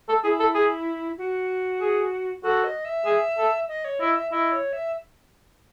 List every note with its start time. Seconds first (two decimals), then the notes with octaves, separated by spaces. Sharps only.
0.09 A4
0.23 E4 G#4
0.40 A4
0.55 G#4
1.18 F#4
1.81 G#4
2.43 F#4 A4
2.64 D#5
2.85 E5
3.05 G#4
3.38 A4
3.68 D#5
3.85 C#5
4.00 E4 D#5
4.16 E5
4.31 E4 D#5
4.52 C#5
4.73 E5